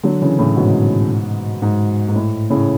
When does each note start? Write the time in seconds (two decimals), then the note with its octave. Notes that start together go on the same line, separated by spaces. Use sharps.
0.03 D3 F#3
0.21 C#3 E3
0.39 A2 C#3
0.56 G#2 B2
1.62 G#2
2.08 G#2
2.16 A2
2.50 A2 C#3